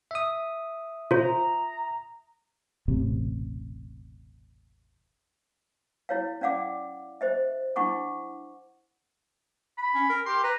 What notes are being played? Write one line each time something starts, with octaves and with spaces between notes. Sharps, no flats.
E5 D#6
F4 C5 A#5
E1 A1 C3
E4 C#5 F5
C#4 D5 F5 F#5 D6
C5 D#5 E5
D4 E4 F#5 C#6 D6
B5
C#4
A#4
G4 C6
B4 A#5